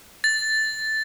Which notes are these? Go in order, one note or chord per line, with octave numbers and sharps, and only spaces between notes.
A6